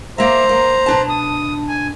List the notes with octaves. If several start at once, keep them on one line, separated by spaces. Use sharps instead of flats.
A#3 C5 E5 A#5
A#3
B2 D4 A5
D#6
G#5